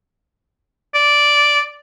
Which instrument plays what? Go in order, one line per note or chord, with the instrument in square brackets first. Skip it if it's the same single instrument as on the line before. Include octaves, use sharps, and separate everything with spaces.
[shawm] D5